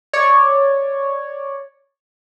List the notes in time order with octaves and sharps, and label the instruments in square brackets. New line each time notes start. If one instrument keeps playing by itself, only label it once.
[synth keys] C#5 D5